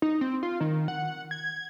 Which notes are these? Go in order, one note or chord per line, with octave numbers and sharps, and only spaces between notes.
D#4
C4
F4
D#3
F#5
G#6